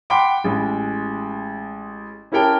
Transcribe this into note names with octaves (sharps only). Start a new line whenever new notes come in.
F#5 G5 B5 C6 D6
A1 G#3
C#4 E4 G4 A#4 G5 A5